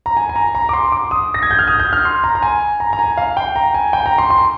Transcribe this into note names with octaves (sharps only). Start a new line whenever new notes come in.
A#5
G#5
G#5
A#5
A#5
D6
C6
D6
D#6
A#6
G#6
G6
F6
D#6
G6
F6
C6
A#5
A#5
G#5
A#5
A#5
G#5
F5
G5
A#5
G#5
G5
A#5
C6
C6